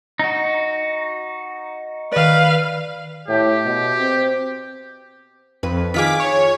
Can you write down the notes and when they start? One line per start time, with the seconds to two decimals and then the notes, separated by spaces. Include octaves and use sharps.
0.19 D#4 F#4
2.12 D#3 B4 D5 F5
3.28 A2 G4
3.65 B2
4.00 C4
5.63 F2 B4
5.94 D#3 F4 G#4 D6 B6
6.20 C#5